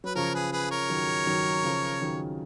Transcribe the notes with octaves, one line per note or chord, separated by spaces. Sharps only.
F#3 B4
C#3 F3 A#4 C#5
G#4 B4
G#4 B4
A#4 C#5
D#3 F#3
D#3 F#3
C#3 F3
D#3 F#3